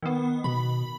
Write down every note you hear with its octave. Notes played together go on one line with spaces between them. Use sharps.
D#3 B3
B2 B5